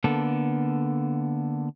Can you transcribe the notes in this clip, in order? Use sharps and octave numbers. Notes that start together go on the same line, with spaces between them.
D3 A#3 B3 A4